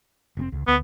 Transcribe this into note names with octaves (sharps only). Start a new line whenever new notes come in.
F1 B2 C4
C#2
D2 B3